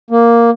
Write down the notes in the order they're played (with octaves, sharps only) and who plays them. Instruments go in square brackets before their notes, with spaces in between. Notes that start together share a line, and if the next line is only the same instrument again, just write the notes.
[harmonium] A#3